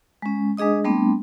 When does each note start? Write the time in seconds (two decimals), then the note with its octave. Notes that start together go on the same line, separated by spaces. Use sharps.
0.22 G#3 C#4
0.57 G#3 D4 G#4 D#5 D#6
0.84 G3 A3 B3 C4 D4